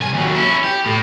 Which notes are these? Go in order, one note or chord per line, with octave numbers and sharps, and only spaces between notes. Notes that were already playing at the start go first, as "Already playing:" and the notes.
C2 G#5
D#2 F#3
C#4 E4
G4
A2